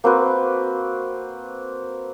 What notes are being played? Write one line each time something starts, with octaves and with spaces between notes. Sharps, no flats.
A#3 C4 F#4 B4